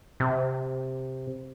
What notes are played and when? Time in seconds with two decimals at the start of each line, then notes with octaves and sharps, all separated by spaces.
0.20 C3